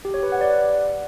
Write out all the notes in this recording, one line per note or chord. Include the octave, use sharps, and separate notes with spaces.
G4
C#5
B4
F#5
D5